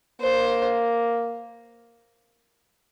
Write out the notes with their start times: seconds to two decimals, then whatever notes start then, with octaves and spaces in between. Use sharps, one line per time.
0.21 A#3 C5